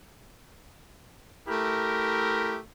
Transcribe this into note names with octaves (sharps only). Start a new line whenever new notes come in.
A3 E4 G4 A#4